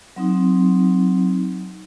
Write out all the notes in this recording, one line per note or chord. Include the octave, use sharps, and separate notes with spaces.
F#3 C4 D#4